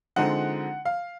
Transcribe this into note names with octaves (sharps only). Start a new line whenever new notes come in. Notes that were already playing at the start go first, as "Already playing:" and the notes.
D3 F3 G#3 C4 D#4 F#5
F5